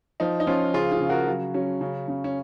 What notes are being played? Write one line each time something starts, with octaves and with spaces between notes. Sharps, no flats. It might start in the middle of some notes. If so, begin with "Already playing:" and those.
F3 D#4
D#4
F3 C#4 F4
C#3 F4 G#4
F4 G#4
C#3
F#4 A#4
F#3
F#3 C#4
C#3
C#3
C#4